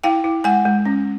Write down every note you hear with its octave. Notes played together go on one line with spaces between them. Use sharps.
E4 F5 G5
E4
G#3 F#5 G#5
G#3
C#4